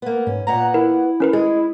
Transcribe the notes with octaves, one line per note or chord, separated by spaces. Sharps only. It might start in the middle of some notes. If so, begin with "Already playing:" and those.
A#3 B3
G#2 C#4
A#2 B3 F#5 A#5
E4 A#4
C#4 A#4 B4
G#3 G#4